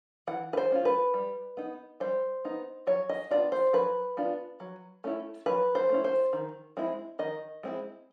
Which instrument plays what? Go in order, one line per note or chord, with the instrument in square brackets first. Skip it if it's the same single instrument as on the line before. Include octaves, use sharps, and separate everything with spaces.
[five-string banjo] E3 F#5
B4
C5
G#3 C#4 F4
B4
G3
B3 D#4
G3 C5
B3 D#4
F#3 C#5
D#5
B3 D4 F4 D5
C5
F#3 B4
B3 D4 F4
F#3
A3 C#4 E4
F#3 B4
C5
A3 C#4 E4
C5
D#3
G#3 C4 E4
D#3 D#5
G#3 C4 E4